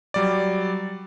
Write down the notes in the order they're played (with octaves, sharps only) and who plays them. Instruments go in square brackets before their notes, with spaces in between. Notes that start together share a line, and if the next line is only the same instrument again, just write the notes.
[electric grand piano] F#3 G3 D5